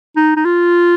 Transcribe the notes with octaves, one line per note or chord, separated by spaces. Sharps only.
D#4
D#4
F4